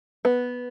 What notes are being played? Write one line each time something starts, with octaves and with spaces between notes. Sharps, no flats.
B3